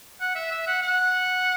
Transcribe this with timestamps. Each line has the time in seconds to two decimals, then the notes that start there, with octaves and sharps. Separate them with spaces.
0.20 F#5
0.35 E5
0.51 E5
0.67 F#5
0.82 F#5